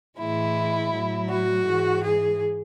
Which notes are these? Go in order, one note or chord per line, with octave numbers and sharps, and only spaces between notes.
A2 E3 G#3 E4
A2 F#3
F#4
G#2 E3 G#3
G#4